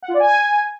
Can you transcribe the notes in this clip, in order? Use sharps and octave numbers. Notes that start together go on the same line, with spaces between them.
F#5
F4
D5
G#5